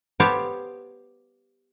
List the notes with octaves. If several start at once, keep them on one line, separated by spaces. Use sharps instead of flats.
B3 G4 C5 C#5 F5 A5